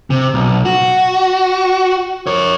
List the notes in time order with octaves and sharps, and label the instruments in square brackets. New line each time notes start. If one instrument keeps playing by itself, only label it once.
[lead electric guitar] C3
B1
F#4
A#4 C#5